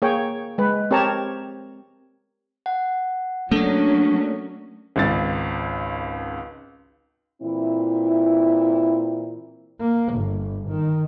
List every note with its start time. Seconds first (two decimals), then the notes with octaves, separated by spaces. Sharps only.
0.02 A#3 G#4 C#5 G5
0.58 G#3 B4
0.91 C4 G4 A#4 C#5 A5 A#5
2.66 F#5
3.51 F#3 A3 A#3 C#4 D4 A4
4.96 G#1 C#2 A6
7.43 A#2 E3 C4 E4
9.80 A#3
10.14 G1
10.68 D#3